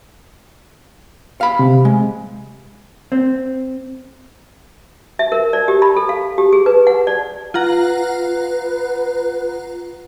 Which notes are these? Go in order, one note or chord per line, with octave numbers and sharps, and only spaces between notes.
F5 B5
C3
G#3
C4
E5
A#4
D5
G4
B5
A4
F5
G4
G#4
B4
F#5
D5
F4 B4 F#5 A#5